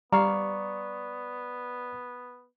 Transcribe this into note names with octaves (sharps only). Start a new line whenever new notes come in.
G3 B3 D5 F5 A#5 C#6